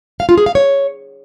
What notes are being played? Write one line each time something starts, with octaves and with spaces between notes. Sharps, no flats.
F5
F4
G#4
F5
C#5